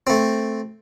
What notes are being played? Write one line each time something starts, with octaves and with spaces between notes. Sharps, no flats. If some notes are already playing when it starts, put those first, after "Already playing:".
A3 C4